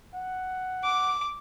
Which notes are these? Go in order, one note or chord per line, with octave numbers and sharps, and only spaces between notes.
F#5
D6